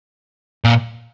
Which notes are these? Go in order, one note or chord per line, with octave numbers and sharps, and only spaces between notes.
A#2